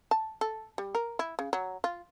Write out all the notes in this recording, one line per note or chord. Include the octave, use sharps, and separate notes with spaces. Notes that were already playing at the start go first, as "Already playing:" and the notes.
A5
A4
G3
A#4
E4
C#3
F#3
F4